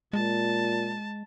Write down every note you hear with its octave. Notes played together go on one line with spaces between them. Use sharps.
A#2 G#3 A5